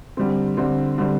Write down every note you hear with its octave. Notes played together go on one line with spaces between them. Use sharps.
D3 G3 C4
D3 G3 C4
D3 G3 C4